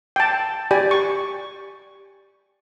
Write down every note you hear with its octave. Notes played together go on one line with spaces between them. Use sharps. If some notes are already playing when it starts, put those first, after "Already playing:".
G5 A5
G4 D5 G#5
C#6